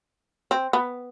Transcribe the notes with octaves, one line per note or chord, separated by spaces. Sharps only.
C4
B3